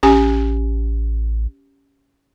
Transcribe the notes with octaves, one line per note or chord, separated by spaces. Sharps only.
A1 C#4 G4 G#5